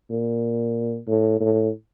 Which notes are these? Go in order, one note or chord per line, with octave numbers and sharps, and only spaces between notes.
A#2
A2
A2